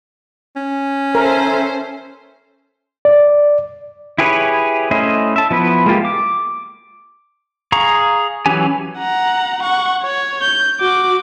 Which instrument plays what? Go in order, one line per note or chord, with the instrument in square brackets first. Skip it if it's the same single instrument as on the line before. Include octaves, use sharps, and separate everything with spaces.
[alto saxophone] C#4
[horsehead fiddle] A4 E5 [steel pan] A#4 [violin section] C5
[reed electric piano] D5
[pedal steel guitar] E4 G4 G#4 B4 C#5
A3 C#4 E4 C5 D#5
E5 A5
F3 B3 E4 B4
G#3 A#3 F4 G4
D6
G#4 F5 A#5 C#6
E3 F#3 C#4 G4 G#5
[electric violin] F#5 A#5
F#5 C#6
C#5
G6
F#4 D6